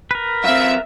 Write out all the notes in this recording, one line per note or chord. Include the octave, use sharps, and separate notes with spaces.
A#4 B4
F#2 C4 E5 F5